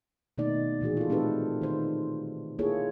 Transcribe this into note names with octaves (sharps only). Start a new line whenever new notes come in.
B2 D#3 A3 A#3 D#4 D5
A#2 E3 F#4 G#4
F4 A4
A3 C4 D#4 G4 A4 B4
D#3 C5
A#3 E4 F4 G#4 A4 C#5